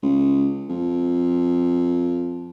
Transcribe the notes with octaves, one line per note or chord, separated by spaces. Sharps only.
C#2
F2